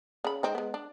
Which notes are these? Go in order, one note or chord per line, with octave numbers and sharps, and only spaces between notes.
C#3 B5
G#3 C4 D#4
G#3 B3
D4